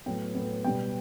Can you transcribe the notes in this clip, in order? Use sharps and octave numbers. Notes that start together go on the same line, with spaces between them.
A2 F#3 B3 G5
A2 F#3 B3
B2 G3 B3 G5